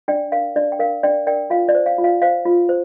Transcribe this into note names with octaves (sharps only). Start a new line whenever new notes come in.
D4 D5 G5
A#4 F5
D4 D5
G5
A#4 F5
D4 D5 G5
A#4 D5 G5
F4 F5
D5
C5
F5
F4
F5
C5 F5
F4
C5